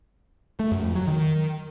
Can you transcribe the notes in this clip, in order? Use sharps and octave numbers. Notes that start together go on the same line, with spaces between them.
A3
F#2
F2
F#3
D#3